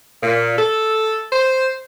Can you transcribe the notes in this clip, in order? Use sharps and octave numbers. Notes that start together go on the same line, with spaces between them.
A#2
A4
C5